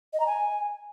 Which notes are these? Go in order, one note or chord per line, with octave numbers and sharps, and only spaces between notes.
D#5
A#5
G#5